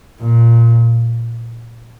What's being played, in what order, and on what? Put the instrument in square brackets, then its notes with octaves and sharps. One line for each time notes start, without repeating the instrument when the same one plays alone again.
[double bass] A#2